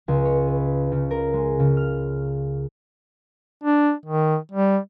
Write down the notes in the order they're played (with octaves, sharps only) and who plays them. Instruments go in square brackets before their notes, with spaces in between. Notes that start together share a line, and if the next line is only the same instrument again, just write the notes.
[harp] C#2
C#5
B4
C#3
A#4
G#3
C#3
F6
[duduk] D4
D#3
G3